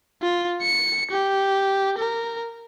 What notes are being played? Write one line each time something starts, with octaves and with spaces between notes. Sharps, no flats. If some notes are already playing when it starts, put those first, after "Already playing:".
F4
C#7
G4
A#4